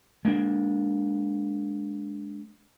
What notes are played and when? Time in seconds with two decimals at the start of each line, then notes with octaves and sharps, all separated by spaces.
0.25 G#3 A#3 D4